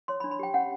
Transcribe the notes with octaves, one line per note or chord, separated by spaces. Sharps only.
C#5 C6
B5
D4
B5
G4 G5
C#4 F#5